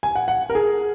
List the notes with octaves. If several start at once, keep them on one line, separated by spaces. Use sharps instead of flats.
G#5
F#5
F#5
A#4
G#4